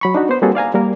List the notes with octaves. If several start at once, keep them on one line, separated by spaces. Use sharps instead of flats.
F#3 B5 C#6
D4 D#4 F#4
B3 C5
G3 A#3 C4 F#4 G#4 A4
D5 F5 G#5 A#5
G3 A#3 A#4